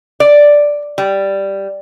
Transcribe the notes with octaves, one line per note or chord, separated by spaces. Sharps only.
D5
G3